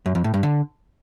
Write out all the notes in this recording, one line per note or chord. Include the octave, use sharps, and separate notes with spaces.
F#2
F2
A2
G2
D3